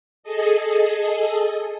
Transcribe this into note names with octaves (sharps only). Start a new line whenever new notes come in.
G#4 A4 D#5